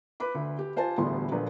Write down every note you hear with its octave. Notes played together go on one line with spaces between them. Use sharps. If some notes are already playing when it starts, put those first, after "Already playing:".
B4 B5 D6
D2
G4
F4 C5 G#5 A5
E1 D2 A2 G3 B3 C6
A#1 A#2 D3 B4